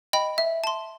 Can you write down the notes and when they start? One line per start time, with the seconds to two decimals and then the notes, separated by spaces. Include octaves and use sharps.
0.13 D#5 G5 B5
0.38 E5
0.64 A5 C6